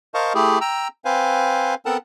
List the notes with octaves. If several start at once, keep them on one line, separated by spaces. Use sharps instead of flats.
A#4 C5 D#5 F5 A5 C#6
A3 E4 G4 G#4
G5 A#5 E6
C4 B4 C5 F5 G#5
B3 C4 A4 A#4 F#5 A5